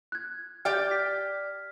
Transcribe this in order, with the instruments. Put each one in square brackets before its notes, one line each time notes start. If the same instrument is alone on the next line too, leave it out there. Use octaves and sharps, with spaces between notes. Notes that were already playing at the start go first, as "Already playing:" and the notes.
[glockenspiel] F#6 G#6
[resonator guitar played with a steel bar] G4 D5 G5 [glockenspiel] F6
[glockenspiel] B6